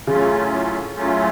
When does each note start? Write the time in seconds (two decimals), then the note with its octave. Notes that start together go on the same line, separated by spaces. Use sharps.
0.07 A2 C#3 F#3 A3 C#4 F4
0.95 A2 F#3 A3 C#4 F4